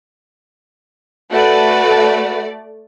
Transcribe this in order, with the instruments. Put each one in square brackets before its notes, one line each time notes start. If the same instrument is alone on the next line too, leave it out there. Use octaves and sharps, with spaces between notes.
[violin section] A3 D5 [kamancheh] F#4 B4